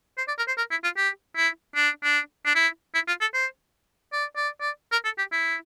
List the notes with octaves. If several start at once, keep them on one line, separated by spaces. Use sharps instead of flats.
C5
D5
A#4
C5
A#4
E4
F4
G4
E4
D4
D4
D4
E4
E4
F4
A4
C5
D5
D5
D5
A#4
A4
G4
E4